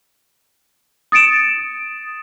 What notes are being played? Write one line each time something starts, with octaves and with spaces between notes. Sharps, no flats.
D#6 A6 C#7 D7 E7